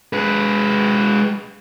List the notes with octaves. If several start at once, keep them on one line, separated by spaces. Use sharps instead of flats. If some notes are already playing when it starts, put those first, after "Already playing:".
G#3 B4